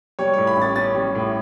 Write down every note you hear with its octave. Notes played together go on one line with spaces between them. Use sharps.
G3 C#5
A2 C#5
B5
A1 A6
C#4 A6
G3
A2